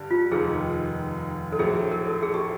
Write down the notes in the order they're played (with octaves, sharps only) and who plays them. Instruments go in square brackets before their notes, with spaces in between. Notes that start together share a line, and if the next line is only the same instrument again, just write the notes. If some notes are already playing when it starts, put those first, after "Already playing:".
Already playing: [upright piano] G2 D3 G3
[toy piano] F4
[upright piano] F1 D#2 D#3 [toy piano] G#4
[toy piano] A4
[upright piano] A#1 A2 F#3 [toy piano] G#4
[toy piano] G#4
A#4
A4
G#4
G4